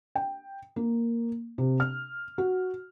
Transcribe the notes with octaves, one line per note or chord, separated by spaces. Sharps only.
G5
A#3
C3
F6
F#4